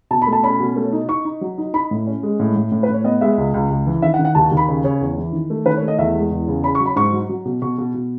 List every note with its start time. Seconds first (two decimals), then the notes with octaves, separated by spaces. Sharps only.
0.11 B2 A5
0.22 B5
0.27 A3
0.32 A5
0.43 C#4 B5
0.60 B2
0.76 A3
0.92 D#4
1.08 D#4 C#6
1.25 D#4
1.41 F#3
1.58 D#4
1.73 D#4 B5
1.91 A2
2.07 C#4
2.23 G#3
2.39 A2
2.56 A2
2.72 A2
2.83 B4
2.88 A2
2.94 C#5
3.04 B3 D#5
3.21 G#3 E5
3.38 C#2
3.54 C#2
3.70 C#2
3.86 E3
4.02 D#3 E5
4.14 F#5
4.19 D#3
4.25 F#5
4.35 D#2 A5
4.51 D#2
4.57 B5
4.68 C#3
4.84 C#3 C#5
5.01 E2
5.17 E3
5.33 D#3
5.50 A3
5.66 D#3 B4
5.77 C#5
5.82 A3
5.88 D#5
5.99 E2 E5
6.15 G#3
6.31 E2
6.48 C#3
6.64 C#4 B5
6.75 C#6
6.80 F#3
6.86 B5
6.96 G#2 C#6
7.13 F#3
7.29 F#3
7.45 B2
7.62 B2 C#6
7.78 B2
7.94 B2